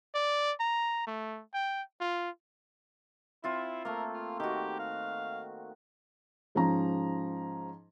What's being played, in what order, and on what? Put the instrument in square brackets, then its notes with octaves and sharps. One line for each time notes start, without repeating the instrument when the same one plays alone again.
[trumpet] D5
A#5
A3
G5
F4
[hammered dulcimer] C4 F4 E5 [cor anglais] E4
[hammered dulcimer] A3 A#3 [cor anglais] A#4
[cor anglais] F4
[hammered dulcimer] D#3 F#4 [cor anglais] G4
[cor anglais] F5
[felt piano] G#2 F3 C#4 A#5